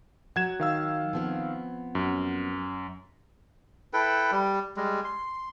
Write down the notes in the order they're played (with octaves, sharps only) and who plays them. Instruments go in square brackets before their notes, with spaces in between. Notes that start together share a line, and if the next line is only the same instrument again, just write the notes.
[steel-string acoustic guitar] F#3 [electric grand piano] F#5 G#6 E7
[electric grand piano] D#3 F5 E6
[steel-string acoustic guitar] F3 B3 C4
[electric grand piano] F#2
[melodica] E4 A4 B4 G5
G3
G3 G#3
C6